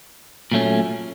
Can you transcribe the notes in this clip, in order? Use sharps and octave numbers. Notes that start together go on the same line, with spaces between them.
A#2 F#3 A3 C#4